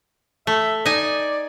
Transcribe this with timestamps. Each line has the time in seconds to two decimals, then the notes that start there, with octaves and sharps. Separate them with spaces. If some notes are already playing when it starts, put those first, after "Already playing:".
0.47 A3 E5
0.86 D#4 D5 G#5